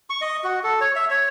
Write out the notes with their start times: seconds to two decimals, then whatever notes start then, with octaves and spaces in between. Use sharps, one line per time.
0.10 C#6
0.21 D#5
0.44 F#4
0.63 A4
0.81 C#5
0.96 E5
1.10 C#5